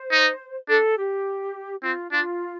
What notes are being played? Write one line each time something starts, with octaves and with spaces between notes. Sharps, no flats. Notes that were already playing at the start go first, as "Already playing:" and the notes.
Already playing: C5
D#4
D4 A4
G4
C4 F4
D4 F4